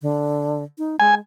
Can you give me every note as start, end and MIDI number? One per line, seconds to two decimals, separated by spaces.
0.02 0.63 50
0.78 0.96 63
1.00 1.20 56
1.00 1.15 80